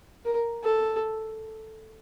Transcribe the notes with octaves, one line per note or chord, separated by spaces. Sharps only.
A#4
A4